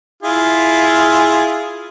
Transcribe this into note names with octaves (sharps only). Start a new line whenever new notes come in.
E4 F4 G#4